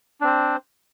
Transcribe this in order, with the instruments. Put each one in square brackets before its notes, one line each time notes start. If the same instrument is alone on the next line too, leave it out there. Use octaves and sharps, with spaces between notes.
[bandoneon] D4
C4
C5